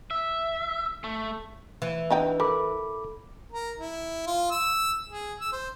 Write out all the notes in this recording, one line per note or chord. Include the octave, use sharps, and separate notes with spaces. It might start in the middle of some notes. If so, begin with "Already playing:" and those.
E5
A3
E3
D4 D#4 G5
A4 A#4 B5 D6
A#4
E4
F4
E6
G#4
E6
C5